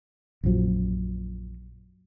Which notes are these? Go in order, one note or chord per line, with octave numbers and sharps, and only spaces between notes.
A#1 F#2 F3 F#3